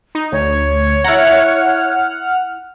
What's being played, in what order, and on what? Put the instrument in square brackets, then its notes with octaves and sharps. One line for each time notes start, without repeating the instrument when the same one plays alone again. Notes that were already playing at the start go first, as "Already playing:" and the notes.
[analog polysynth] D#4
[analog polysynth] D2 [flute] C#5
[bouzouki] E4 A#5 [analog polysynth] F#5 F6